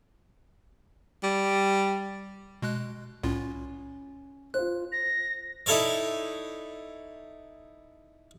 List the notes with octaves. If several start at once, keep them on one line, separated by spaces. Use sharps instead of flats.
G3
B2 G#3 F#6
C2 A2 C#4 F4
F4 C5 F#6
A#6
D#4 E4 A4 C#5 D5